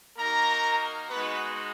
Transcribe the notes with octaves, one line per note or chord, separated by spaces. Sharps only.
A#3 D#4 F#4 A#4 A#5
G#3 B3 D#4 F#4 B4